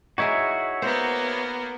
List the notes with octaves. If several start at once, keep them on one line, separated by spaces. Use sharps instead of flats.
D#4 E4 F#4 G#4 C#5 E5
A#3 B3 C5